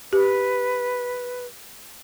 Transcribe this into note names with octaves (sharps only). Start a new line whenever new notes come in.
G4 B4